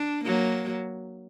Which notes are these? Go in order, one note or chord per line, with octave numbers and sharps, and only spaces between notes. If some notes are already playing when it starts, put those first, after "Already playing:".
Already playing: D4
F#3 A#3